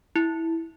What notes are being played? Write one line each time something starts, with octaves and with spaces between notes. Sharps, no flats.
E4